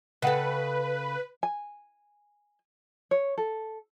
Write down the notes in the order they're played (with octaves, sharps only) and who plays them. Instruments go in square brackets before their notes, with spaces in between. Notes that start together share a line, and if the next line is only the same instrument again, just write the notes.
[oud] C#3 A4 [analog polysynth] B4 [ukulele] D#5 F#5 G5
[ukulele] G#5
C#5
A4